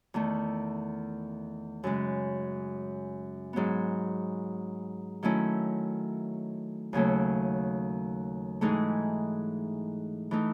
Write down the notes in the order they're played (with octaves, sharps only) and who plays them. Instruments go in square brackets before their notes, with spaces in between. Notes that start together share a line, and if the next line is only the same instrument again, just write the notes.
[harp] E2 D#3 A3
F#2 C#3 G#3
G#2 F#3 B3
D#3 F#3 A3 C#4 E4
D#2 C#3 F#3 A3
G#2 E3 A3 D#4 G#4
E3 A3 D#4